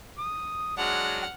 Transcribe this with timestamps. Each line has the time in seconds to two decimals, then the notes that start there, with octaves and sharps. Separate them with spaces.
0.18 D#6
0.77 F#3 G#3 D4 F#5 F6